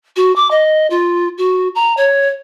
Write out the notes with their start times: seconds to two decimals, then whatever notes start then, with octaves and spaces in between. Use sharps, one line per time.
0.16 F#4
0.36 D6
0.51 D#5
0.90 F4
1.38 F#4
1.75 A#5
1.97 C#5